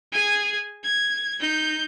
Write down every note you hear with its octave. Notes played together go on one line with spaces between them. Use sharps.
G#4 G#5
G#6
D#4 G6